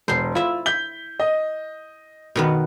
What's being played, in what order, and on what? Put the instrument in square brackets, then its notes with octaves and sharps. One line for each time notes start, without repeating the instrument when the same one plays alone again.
[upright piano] E1 [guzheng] C5 C6
[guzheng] E4 E5 [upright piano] F4
[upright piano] G6 B6 G7
D#5
[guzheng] B2 D#3 B3